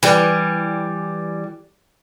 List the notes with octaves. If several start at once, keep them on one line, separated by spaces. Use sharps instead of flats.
E3 G3